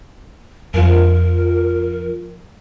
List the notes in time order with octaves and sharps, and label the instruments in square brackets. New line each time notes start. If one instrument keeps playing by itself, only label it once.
[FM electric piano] F2 F3 F4 [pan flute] A#4